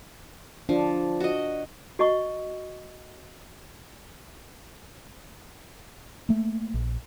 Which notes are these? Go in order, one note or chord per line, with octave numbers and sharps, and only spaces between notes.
F3 D4
F#4 D#5
F#4 D#5 C#6
A3 A#3
A#1